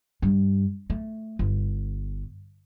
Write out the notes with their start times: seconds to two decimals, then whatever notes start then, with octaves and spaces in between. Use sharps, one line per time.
0.22 G2
0.90 A3
1.39 G1